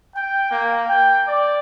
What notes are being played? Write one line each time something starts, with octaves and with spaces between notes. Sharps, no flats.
G5
A#3
G5
D5